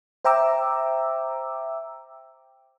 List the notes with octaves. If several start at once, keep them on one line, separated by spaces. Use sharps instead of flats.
C5 E5 G5 A#5 D6 E6